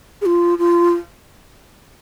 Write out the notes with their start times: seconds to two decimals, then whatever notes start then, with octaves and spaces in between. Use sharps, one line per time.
0.21 G#4
0.26 F4
0.58 F4